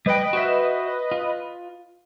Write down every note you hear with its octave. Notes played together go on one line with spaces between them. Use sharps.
G3 B4 D#5 G5
F#4 C5 E5
F4